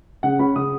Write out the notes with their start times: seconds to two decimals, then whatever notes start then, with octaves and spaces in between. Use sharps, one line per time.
0.23 C#3 F#5
0.39 C#4 B5
0.56 C#3 D#6